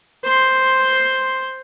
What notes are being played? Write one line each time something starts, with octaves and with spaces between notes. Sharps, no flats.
C5 C6